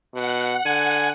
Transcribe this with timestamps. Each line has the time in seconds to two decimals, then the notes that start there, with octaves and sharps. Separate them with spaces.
0.14 B2 F#5
0.65 D3 G#5